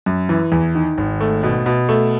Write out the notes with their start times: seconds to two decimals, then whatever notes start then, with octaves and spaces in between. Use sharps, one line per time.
0.06 F#2
0.29 E3
0.52 E2
0.75 D#3
0.98 G#1
1.20 A3
1.43 B2
1.66 B2
1.89 A3